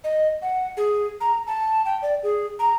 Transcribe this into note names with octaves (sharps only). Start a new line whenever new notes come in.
D#5
F#5
G#4
A#5
A5
G5
D5
G#4
A#5